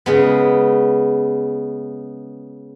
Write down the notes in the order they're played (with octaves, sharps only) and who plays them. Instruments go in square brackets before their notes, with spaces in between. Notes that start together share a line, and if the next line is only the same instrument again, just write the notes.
[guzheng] C#3 G#3 B3